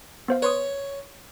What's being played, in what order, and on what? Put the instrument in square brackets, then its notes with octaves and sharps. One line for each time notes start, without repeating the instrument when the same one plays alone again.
[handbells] B3 C5 F5
[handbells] B4 C6 D#6 [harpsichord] C#5